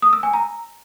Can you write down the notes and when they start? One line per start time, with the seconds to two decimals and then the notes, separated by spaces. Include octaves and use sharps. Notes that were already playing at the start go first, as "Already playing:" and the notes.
0.02 D#6
0.13 E6
0.23 G#5
0.33 A#5